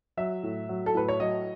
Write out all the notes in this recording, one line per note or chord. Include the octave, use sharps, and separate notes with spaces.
F#3 E5
A2
F#3
A4
A2 B4
C#5
F#3 D#5